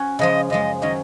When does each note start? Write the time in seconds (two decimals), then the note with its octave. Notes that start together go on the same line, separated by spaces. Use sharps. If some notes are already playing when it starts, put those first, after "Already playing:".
Already playing: C#4 F#4
0.19 C#3 F3 G#3 D#5
0.50 F#2 F3 G#3 D#5
0.81 D#3 F#3 C#4 D#5